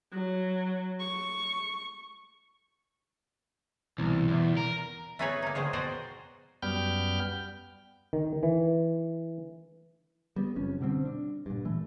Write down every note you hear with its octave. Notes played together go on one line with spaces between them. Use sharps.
F#3
C#6
C2 B2 E3
E2
A#4
A3 B3 D#4 G#4 B4 C#5
A#3 D#4
D#3 F3 G#3 G#4 C#5
B2 F#4 C5 D5 D#5 A#5
F#2 G3 B3 G5 F6 G6
D#3
E3
G3 G#3 B3
F#1 F2 C#4
B2 D3 G3 C4
D4
G2 A#2
A#2 E3 A3